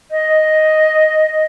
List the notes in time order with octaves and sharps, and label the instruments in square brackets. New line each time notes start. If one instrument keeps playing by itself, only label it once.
[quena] D#5